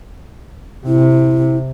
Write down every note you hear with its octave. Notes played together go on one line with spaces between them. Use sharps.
C3 E4